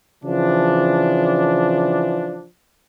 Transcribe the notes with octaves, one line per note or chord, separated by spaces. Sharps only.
C#3 E3 F3 D4